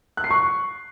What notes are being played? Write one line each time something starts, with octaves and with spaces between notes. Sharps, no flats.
F#6
C7
C#6